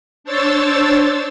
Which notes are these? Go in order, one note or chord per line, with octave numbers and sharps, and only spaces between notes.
D4 C5 C#5 E6 A6